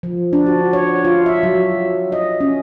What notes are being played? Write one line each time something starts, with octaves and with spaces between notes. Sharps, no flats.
F3
D4
F#4
C#5
F4
E5
F#3
D#5
C#4